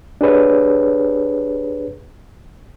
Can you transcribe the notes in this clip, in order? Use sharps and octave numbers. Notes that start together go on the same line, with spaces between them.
D4 G4 G#4 B4 C#5